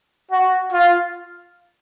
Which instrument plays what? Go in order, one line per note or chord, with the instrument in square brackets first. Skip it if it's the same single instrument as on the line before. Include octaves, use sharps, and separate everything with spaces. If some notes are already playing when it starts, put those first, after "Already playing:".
[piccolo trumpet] F#4
F4